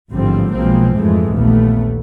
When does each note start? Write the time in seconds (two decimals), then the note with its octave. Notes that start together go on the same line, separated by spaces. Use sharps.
0.12 A1 G#2 D3 F3 G3 C4
0.54 B1 B2 F3 G#3 A#3 C4
0.95 F2 G#2 E3 G#3 A3
1.35 A#1 D#2 A3 B3